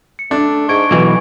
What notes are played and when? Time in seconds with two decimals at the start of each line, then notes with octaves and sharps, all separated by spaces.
0.19 C#7
0.31 A3 D4
0.69 G#2 C#6 G#6 D7
0.91 B1 B2 E3 G#6